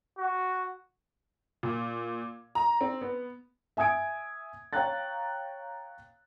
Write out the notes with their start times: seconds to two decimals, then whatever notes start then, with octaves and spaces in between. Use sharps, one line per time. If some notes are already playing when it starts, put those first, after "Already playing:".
0.18 F#4
1.63 A#2
2.55 A#5
2.81 C4
3.01 B3
3.77 E5 G#5 D#6 G#6 D7
4.73 C#5 F5 G5 A#5 F#6 A6